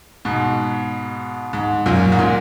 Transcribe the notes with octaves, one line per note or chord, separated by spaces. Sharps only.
G#2 B2
G#2
F#2 A#2
G#2
A#2